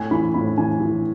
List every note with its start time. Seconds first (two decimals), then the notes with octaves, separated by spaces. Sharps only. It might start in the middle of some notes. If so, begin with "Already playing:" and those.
Already playing: A2 G#5
0.11 E3 B5
0.34 A2 B5
0.58 E3 G#5
0.81 E3